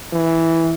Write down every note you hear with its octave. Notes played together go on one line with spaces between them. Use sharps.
E3